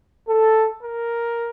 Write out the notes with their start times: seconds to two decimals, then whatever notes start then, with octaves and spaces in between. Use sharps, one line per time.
0.28 A4
0.82 A#4